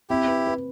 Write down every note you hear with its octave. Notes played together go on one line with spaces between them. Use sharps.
C4 E4 G4
B4
B4